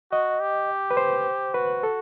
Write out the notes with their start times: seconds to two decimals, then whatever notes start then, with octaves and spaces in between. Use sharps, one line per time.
0.12 F#4 D#5
0.41 G4
0.91 B4
0.97 C5
1.54 F#4 B4
1.83 A4